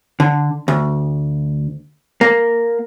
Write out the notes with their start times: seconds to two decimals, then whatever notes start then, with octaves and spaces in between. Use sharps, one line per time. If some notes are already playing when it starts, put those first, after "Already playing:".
0.20 D3
0.68 D2
2.21 A#3